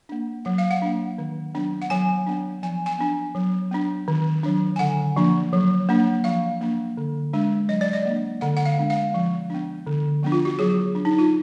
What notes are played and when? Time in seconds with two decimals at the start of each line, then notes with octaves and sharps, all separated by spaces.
0.09 A#3 D4
0.45 F#3 F#5
0.58 F5
0.71 F#5
0.82 A#3 D4
1.18 D#3
1.55 F#3 B3 D4
1.82 F#5
1.90 F#3 G#5
2.27 B3 D4
2.63 F3 G#5
2.86 G#5
2.98 B3 D4
3.35 F#3
3.71 B3 D4
4.08 D#3
4.43 F#3 D4
4.76 G#5
4.79 D3 F#5
5.16 F3 A#3 D4
5.53 F#3
5.89 A#3 D4
6.24 F3 F5
6.61 A#3 D4
6.97 D3
7.33 G#3 D4
7.69 F#3 D#5
7.81 D5
7.93 D#5
8.06 A#3 D4
8.41 D3 F#5
8.57 F#5
8.66 F5
8.78 G#3 B3 D4
8.90 F5
9.14 F3
9.50 B3 D4
9.87 D3
10.23 F3 B3 D4
10.32 F4
10.45 F#4
10.59 F#3 G#4
10.95 D4
11.05 D#4
11.19 F4